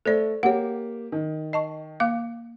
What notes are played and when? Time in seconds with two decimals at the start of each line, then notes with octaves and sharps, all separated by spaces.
0.05 A3 A4 C5 D5
0.43 A#3 G4 C#5 F#5
1.12 D#3
1.53 D#5 A5 C#6
2.00 A#3 F5 D6